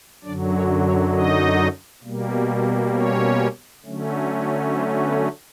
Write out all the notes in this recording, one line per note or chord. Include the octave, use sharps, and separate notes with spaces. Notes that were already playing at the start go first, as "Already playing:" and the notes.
F#2 D3 F#3 D4 D5
C#4 C#5
C#4 C#5
D#4 D#5
B2 G3 A#3
C#4 C#5
D3 F#3 A3 C#4
C4 C5
B3 B4